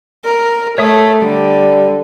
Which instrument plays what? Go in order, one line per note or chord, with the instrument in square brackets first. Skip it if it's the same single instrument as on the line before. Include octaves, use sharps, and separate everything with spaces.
[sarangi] A#4
[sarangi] A3 [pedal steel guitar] C#5 E5 D#6
[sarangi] D3 [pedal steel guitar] G3